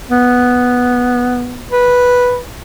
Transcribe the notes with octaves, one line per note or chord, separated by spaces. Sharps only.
B3
B4